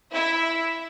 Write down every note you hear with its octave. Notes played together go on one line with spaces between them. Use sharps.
E4 E5